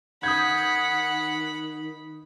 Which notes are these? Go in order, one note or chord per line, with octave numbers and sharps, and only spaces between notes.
D#3 F#5 B5 D#6 G6 G#6